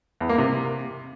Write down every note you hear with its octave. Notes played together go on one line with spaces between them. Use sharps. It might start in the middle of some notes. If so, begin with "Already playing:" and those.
E2
A#3
C3